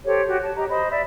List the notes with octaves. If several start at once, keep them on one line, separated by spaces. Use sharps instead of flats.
G4 A4 C5 C#5
F#4 G4
C#5 A5
G4 D#5 A#5
C5 D#5 B5
D5 E5